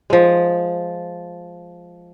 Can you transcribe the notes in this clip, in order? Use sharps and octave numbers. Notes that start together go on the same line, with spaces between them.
F3 G#3